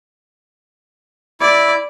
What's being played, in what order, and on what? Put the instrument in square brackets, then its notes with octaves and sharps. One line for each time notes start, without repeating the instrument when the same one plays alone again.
[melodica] E4 [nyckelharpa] D5